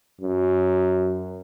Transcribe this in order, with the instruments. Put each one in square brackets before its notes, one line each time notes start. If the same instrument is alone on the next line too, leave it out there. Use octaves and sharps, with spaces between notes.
[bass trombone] F#2